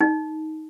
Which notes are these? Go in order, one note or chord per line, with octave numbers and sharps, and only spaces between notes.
D#4